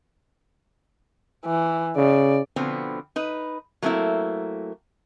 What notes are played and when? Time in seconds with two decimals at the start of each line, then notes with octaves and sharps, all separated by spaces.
1.46 E3
1.97 C#3 D5
2.56 B2 D3 F3 B3 C4
3.16 D#4 B4
3.82 F#3 A3 A#3 C4 E4